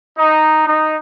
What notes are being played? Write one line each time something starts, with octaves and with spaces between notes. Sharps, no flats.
D#4
D#4